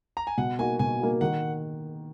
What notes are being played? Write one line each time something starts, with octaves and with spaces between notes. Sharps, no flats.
A#5
G#5
B2 F#5
A#3 D#4 F#4 G#5
B2 G#5
A#3 D#4 F#4
D#3 F#5